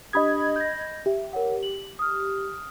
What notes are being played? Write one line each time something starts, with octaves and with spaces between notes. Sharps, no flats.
D4 G4 D#5 B5 D#6 G#6
G6 A#6
G4 E5
A#4 C#5 F#5
F#7
D#6 F6